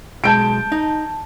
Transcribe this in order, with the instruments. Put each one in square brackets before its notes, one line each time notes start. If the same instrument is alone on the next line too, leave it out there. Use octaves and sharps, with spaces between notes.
[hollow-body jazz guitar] B1 G#3 [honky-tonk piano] A5 G6 D7
[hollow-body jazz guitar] D#4